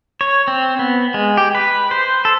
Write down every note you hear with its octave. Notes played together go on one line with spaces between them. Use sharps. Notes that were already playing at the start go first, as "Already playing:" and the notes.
C#5
C4
B3
G#3
G4
B4
C5
A4